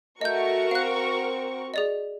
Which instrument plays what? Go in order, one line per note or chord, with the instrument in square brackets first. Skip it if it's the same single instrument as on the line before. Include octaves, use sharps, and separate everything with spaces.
[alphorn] A3 [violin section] F#4 A#4 C#6 [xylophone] D#5 G6
[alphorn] C4 [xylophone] F5 F#6
[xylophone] G#4 D5 D#5